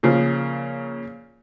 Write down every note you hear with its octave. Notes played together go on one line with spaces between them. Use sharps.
A#2 C#3 F3